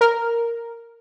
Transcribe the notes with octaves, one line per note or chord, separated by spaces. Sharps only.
A#4